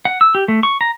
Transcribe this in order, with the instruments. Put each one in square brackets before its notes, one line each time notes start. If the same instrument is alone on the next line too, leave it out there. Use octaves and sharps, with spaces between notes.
[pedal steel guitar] F#5
E6
G4
A3
C#6
A#5